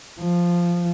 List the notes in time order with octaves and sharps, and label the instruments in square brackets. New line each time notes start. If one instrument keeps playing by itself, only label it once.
[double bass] F3